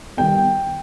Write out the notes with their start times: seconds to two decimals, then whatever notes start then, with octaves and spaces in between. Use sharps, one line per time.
0.17 D#3 G3 B3 G5